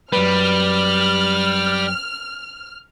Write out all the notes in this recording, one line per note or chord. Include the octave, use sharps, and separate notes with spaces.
F#2 G3 B4 F6